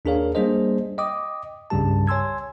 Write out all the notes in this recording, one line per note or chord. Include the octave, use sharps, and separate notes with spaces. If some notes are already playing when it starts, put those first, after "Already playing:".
D#2 D4 G#4 A#4 C#5 F5
G3 A#3 D4 G#4 C5 D#5
D#5 G5 D6 D#6
C2 G2 C#3 G3 G4 A5
C#5 G#5 C6 E6 G#6